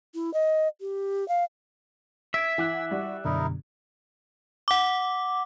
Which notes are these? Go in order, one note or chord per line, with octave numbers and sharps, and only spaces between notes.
E4
D#5
G4
F5
E5 E6 G#6 D7
E3 E4 F#5 D6 F#6
G3 F#4
F#2 B2 D3 D#4 E4 A#4
F#5 D6